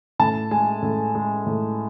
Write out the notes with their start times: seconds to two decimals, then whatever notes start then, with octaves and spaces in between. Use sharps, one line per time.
0.19 A2 A5
0.51 G#3 G#5
0.82 A2
1.15 G#3
1.46 A2